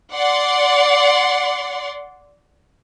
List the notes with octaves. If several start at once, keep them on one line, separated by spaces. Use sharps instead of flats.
D5 F#5 C6